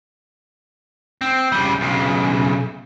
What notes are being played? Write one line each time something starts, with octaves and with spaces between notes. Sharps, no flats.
C4
C#3 G3
B1 C#3